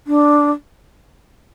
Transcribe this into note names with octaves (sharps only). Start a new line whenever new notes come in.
D4